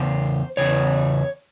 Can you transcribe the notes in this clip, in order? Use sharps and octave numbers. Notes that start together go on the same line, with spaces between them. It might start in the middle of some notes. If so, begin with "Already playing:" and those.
Already playing: E2 C#3 C5
E2 C#3 C#5